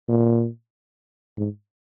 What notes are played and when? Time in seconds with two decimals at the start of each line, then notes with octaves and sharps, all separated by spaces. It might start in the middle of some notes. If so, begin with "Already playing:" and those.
0.09 A#2
1.38 G#2